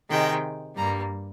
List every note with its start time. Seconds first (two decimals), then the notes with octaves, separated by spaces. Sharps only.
0.10 C3 D#3 G#3 G5
0.77 G2 G3 A#3 A#5